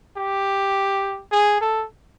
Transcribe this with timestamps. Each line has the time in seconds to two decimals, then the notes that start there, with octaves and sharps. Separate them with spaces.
0.17 G4
1.32 G#4
1.61 A4